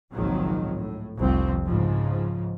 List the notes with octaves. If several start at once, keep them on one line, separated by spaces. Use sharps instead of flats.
G#1 C#2 A#2 D#3 F3 F#3
A2
F1 C2 F2 F3 C4
G#2 C#3 F3